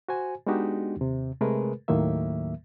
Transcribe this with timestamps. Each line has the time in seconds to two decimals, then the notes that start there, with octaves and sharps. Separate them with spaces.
0.09 F#4 C5 G#5
0.47 G#3 B3 D4 D#4 F#4 G4
0.97 D#2 C3
1.41 C3 G#3 A3 G#4 A#4 B4
1.88 D#2 A2 D#3 F#3 A#3 E5